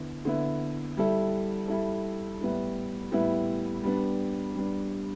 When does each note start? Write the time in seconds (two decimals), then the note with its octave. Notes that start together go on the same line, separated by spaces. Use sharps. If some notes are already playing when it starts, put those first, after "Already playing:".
Already playing: D3 B3 E4
0.25 D3 B3 E4
0.97 G3 E4 A4
1.68 G3 E4 A4
2.41 A2 G3 B3 E4
3.12 A2 G3 B3 E4
3.84 G3 B3 D4
4.55 G3 B3 D4